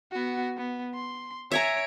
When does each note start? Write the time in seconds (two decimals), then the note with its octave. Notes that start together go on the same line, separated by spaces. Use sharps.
0.12 B3 F#4
0.57 B3
0.94 C6
1.52 C#5 E5 G#5 A#5 D7